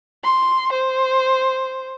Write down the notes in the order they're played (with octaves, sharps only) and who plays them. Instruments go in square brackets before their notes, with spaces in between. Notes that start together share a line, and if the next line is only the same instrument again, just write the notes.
[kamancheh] C6
C5